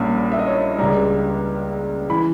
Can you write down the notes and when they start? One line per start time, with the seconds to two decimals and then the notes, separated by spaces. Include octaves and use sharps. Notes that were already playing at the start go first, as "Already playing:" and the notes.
Already playing: A#1 A#2 G3 C#4 B5
0.32 E5
0.39 D#5
0.47 C#5
0.78 C#2 C#3 G3 A#5
2.10 E3 B5